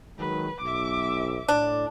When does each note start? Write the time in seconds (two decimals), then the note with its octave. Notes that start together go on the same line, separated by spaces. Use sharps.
0.18 D#3 F#3 G#3 B4
0.61 B1 E5 D6
1.48 A2 D4 D5